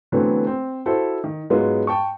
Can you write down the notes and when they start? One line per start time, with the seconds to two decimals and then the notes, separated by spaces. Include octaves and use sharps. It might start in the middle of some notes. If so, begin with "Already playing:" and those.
0.12 D3 E3 F#3 A3 B3 C4
0.47 C4
0.86 E4 F#4 A4 C5
1.24 D#3
1.50 G#2 F#3 G#3 B3 F4
1.87 G5 A5 C#6